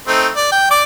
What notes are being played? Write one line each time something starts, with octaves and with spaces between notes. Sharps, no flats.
A3 C4 D#4
D5
G5
D5 D6